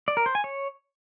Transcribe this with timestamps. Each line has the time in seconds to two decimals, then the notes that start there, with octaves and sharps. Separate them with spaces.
0.08 D5
0.17 A#4
0.26 C5
0.35 G#5
0.44 C#5